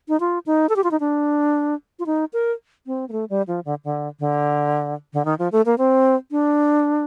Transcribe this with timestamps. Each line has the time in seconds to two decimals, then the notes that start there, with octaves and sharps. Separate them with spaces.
0.08 D#4
0.20 F4
0.46 D#4
0.69 A4
0.76 G4
0.84 F4
0.91 D#4
1.00 D4
1.99 F4
2.06 D#4
2.33 A#4
2.86 C4
3.09 A#3
3.12 A3
3.30 G3
3.48 F3
3.65 D3
3.84 D3
4.20 D3
5.13 D3
5.25 D#3
5.39 F3
5.52 A3
5.66 A#3
5.78 C4
6.31 D4